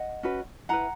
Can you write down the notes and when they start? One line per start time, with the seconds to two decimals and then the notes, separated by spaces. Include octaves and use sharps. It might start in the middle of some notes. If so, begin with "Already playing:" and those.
Already playing: D#5 F#5
0.23 C#4 F#4 B4
0.69 E4 B4 F#5 A#5